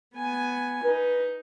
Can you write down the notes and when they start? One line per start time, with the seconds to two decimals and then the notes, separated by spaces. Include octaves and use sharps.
0.15 B3 G#5
0.84 D#4 B4